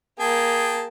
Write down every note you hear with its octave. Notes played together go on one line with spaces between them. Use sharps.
A#3 G#4 G5 A5